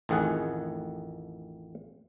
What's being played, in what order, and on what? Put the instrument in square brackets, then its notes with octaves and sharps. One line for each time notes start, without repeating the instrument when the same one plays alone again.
[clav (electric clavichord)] A1 F2 D#3 G#4 F#5